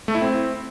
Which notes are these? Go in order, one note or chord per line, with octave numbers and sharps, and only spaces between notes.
A3
E4
C4